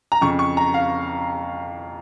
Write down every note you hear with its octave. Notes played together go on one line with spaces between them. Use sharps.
A#5
F2 C#3 C#6
C#6
A#5
F5